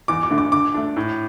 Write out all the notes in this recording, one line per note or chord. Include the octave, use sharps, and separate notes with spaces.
E2 D6
D6
D3 A3 D4
D6
D3 D6
A3 D4
A2